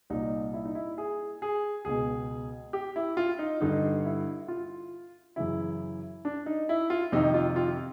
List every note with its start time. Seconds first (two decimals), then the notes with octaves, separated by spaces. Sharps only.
0.10 C2 A#2 D#4
0.54 E4
0.65 D#4
0.75 E4
0.98 G#4
1.42 G#4
1.85 C#2 B2 G#4
2.73 G4
2.96 E4
3.17 F4
3.39 D#4
3.61 G2 D3 D#4
4.05 E4
4.48 F4
5.36 F#2 C#3 E3 E4
6.25 D4
6.46 D#4
6.69 E4
6.90 F4
7.12 F2 C3 D#3 D#4
7.34 F4
7.56 F4